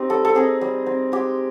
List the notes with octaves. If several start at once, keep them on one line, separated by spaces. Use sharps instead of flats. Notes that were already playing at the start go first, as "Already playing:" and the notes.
Already playing: C4 D#4 G4
G3 A4
A4
C4 D#4 G#4
G3
C4 D#4
G#3 G4